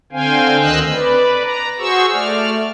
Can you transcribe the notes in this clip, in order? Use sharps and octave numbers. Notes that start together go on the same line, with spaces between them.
D3 C4 C5 F5 G5 G#5
D2 D#3 C4 D#5 E6 F#6
B4 D5
A#5
F#4 G#4 C5 C#6 E6
A3 D5 F6